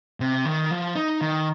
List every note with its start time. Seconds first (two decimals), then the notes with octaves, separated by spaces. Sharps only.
0.20 C3
0.45 D#3
0.71 F3
0.96 D#4
1.21 D#3